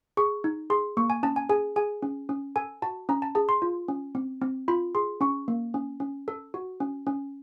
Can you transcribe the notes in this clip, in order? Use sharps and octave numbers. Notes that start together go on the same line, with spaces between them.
G#4 C#6
D#4
G#4 C6
A#3 C#6
G#5
C#4 A5
G#5
G#4 G#5
G#4 G#5
C#4
C#4
A4 G#5
F#4 A5
C#4 A#5
A5
G#4 A5
C6
F4
C#4
C4
C4
F4 B5
G#4 C6
C#4 C#6
A#3
C#4
C#4
A4
F#4
C#4
C#4